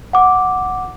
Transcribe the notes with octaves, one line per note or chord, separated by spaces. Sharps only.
F#5 D6